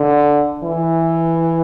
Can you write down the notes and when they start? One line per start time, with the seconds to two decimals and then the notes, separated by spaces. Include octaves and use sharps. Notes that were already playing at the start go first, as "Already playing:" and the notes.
Already playing: D3
0.64 E3